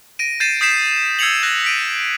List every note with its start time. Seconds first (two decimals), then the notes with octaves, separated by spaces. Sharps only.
0.19 A#6 D7 D#7
0.40 G6 A6 C7 D#7 E7
0.61 D#6 G6 B6 C7 D7 E7
1.19 E6 G#6 C7 C#7 F7 F#7
1.43 F#6 A#6
1.64 B6 D7 D#7